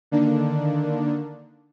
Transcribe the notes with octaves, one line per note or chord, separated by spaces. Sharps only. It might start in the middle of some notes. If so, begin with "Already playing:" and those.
D3 D#3 A#3 D4